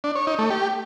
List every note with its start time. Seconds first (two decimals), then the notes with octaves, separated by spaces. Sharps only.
0.04 D4
0.16 C#5
0.27 D#4
0.39 A3
0.50 G4